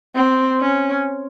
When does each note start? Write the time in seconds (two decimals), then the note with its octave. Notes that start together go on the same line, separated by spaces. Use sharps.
0.15 C4
0.61 C#4